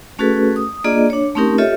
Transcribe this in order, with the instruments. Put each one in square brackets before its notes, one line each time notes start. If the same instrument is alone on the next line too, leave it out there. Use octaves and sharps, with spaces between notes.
[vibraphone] A3 C#4 F#4 G#4 A4 B4
D#6
A#3 D4 F4 G#4 D5 D#5
D4 C#5
A3 C4 C#4 D#4 G4 A#4
F4 G4 A4 C#5 D#5 E5